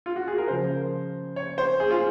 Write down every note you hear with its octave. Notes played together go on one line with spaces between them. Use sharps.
F4
F#4
G#4
A#4
C#3 F3 C5
C#5
C5
G#4
F4